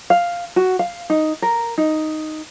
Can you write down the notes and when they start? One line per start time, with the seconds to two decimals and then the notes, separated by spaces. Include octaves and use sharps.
0.10 F5
0.56 F#4
0.79 F5
1.10 D#4
1.42 A#4
1.78 D#4